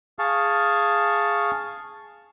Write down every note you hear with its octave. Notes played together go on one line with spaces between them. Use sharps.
G#4 F5 A5 C#6